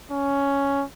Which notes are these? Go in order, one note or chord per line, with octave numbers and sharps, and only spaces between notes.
C#4